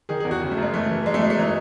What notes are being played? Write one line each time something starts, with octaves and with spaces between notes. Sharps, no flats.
D#3 G#4
E2 G#4
F#4
C#3
A3
F#2
G#3
E3 A3
E3
F#3 G#3
A3
F#3 G#3
A3
E3 D#4